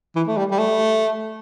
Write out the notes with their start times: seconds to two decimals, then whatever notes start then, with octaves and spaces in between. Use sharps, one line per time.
0.16 E3
0.27 A3
0.37 G3
0.51 G3
0.59 A3